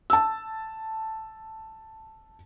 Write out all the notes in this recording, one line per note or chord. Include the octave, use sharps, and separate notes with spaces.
A5 E6